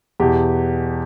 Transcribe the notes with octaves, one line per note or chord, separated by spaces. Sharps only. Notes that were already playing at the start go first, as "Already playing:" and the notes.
E2 B2 G4